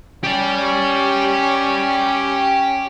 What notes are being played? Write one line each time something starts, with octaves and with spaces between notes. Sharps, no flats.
C#4 G4 D5